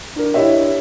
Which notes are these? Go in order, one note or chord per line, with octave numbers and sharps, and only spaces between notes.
D4 A#4
D4 E4 G4 C#5 D#5 E5